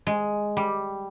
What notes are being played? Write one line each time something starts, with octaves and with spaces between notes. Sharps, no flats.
G#3
G3